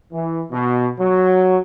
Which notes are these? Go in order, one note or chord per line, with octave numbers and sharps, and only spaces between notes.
E3
B2
F#3